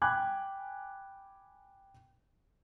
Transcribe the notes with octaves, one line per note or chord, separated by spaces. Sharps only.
G5 G#5 B5 D6 F#6 G#6